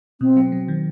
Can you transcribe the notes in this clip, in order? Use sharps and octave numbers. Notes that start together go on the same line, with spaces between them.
B2 C4
F#3
F#3
D#3